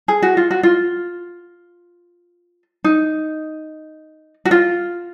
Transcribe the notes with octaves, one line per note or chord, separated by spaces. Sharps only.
G#4
F#4
F4
F#4
F4
D#4
F#4
F4